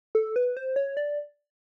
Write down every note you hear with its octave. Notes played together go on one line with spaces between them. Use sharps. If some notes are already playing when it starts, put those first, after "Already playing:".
A4
B4
C5
C#5
D5